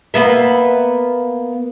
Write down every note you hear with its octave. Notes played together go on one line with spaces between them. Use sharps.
A#3 B3 E5